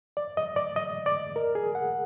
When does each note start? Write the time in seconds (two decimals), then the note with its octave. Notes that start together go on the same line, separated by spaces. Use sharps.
0.17 D5
0.37 D#5
0.56 D5
0.76 D#5
1.06 D5
1.36 A#4
1.55 G#4
1.75 F#5